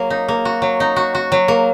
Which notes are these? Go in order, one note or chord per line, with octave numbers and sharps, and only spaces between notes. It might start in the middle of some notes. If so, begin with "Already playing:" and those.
Already playing: F#3 A#3
D#4
A#3
F#4
F#3
D#4
F#4
F#4
F#3
A#3